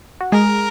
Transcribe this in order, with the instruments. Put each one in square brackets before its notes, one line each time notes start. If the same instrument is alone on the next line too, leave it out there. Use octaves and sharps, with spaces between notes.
[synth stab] F#4
[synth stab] G#3 G#4 [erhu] A#4